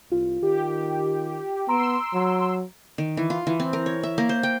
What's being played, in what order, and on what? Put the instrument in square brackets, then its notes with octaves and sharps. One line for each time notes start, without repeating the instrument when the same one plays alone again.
[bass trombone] C2 [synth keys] F4
[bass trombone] D#3 [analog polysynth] G4
[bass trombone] B3 [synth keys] A#5 D7 [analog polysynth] C6 E6
[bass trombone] F#3
[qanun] D#3
E3
F4
E3
C4
A#4
C#5
E5
A#3
C5
G5